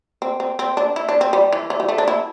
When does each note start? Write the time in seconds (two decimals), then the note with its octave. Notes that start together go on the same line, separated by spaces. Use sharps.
0.22 C4
0.40 C4
0.59 C4
0.77 D4
0.96 E4
1.09 D4
1.21 C4
1.33 G3
1.53 E3
1.70 E3
1.80 G3
1.89 A3
1.98 D4
2.08 E4